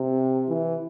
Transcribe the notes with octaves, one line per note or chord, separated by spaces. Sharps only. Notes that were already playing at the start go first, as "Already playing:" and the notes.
Already playing: C3
E3